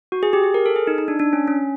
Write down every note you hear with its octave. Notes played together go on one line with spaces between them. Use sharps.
F#4
G#4
G4
G#4
A#4
A4
G#4
D#4
D#4
D4
D4
C#4
C#4